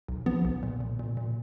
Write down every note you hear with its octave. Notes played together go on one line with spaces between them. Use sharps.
B1
F3 B3
B1
A#2
A#2
A#2
A#2